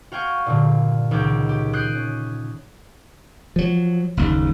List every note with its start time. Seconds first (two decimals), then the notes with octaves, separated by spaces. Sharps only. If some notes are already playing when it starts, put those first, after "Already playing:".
0.12 F#4 F5 G5 G#5 C#6
0.46 G2 A#2 D3
1.11 C#2 D#3 C#4 F#4 D6 G6
1.49 G4
1.73 D#6 F#6 G6 C7 D7
1.95 C#4
3.56 F3 F#3
4.17 F#1 D#2